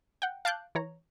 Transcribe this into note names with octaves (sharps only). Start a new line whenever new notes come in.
F#5 G5
F5 A5 D6 F#6 G6
E3 C#5 A#5